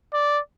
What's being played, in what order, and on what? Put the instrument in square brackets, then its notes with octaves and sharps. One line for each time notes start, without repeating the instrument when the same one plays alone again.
[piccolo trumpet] D5